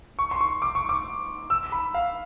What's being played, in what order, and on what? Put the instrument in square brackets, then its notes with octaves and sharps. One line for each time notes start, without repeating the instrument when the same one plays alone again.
[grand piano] C#6
C6
C#6
D6
C#6
D6
E6
B5
F5